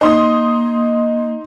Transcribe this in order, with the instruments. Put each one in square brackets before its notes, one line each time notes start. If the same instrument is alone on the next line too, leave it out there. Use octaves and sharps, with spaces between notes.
[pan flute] A#3 [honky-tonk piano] D#4 C6 D#6